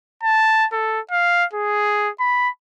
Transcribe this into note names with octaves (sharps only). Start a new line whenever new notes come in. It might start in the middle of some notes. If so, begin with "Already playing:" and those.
A5
A4
F5
G#4
B5